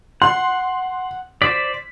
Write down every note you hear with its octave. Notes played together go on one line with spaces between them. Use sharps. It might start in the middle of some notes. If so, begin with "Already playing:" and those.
F#5 C6
C5 D5 B6